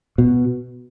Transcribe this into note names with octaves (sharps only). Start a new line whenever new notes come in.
B2